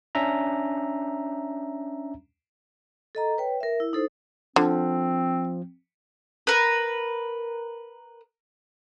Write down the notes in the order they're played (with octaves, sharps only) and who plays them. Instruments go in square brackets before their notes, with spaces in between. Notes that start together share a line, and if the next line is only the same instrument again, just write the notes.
[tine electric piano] C#4 D4 E5 A#5
[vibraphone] A4 D#5 A#5
B4 C#5 G5
A#4 E5
E4
D#4 A4 C5
[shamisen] D3 [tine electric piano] F3 [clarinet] C4
[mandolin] A#4 B4